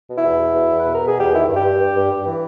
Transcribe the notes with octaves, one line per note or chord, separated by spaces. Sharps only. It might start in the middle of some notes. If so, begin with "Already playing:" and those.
B2
E4
E2
B2
E2
E2
B4
B2
A#4
B2 G#4
E2 G4
D#3 E4
G2
G4
G2
G2
G2
G2
E3